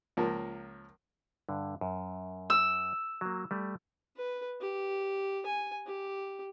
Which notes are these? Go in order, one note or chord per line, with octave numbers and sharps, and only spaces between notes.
C#2 F3 A#3
G2 D3
F#2
E6
F#3 A#3
G3 A3
B4
G4
G#5
G4